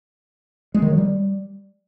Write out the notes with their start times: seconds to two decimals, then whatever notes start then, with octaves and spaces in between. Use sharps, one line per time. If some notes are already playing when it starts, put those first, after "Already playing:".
0.74 G#3
0.82 D#3
0.90 F#3
0.98 G3